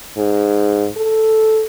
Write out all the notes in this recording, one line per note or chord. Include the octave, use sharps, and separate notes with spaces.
G#2
A4